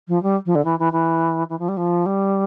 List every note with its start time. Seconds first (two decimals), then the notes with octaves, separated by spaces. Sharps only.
0.08 F3
0.23 G3
0.46 F3
0.55 D3
0.65 E3
0.79 E3
0.93 E3
1.49 E3
1.59 F3
1.68 G3
1.77 F3
2.06 G3